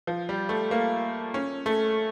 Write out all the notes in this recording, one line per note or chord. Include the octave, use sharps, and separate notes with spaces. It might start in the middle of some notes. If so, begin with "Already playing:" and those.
F3
G3
A3
A#3
C#4
A3